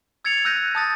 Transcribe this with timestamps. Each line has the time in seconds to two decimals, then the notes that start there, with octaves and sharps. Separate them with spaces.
0.24 E6 G#6 A6 C#7 F7
0.45 E6 F#6 G6 A#6 D#7
0.75 A5 D#6 A6 A#6